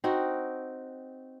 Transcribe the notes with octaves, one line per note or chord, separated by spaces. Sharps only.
C4 D#4 F#4